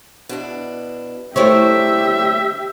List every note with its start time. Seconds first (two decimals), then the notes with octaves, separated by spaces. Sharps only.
0.29 B2 D4 E4
1.36 F#3 G3 A3 E4 G4 C5 C#5 E5